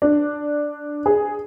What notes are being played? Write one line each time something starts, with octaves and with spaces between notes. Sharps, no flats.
D4
G#4